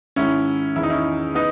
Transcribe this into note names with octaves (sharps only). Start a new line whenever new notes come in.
G#2 D#3 C#4 E4
E2 D#3 E4
D#4
C#4 E4
B3 D#4